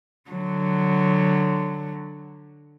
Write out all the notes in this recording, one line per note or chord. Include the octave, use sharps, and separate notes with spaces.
D3 F#3